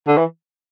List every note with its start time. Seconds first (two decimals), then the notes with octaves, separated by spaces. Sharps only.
0.07 D3
0.17 E3